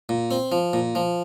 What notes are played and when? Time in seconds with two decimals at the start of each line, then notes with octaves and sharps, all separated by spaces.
0.09 A#2
0.31 C4
0.52 F3
0.73 A#2
0.95 F3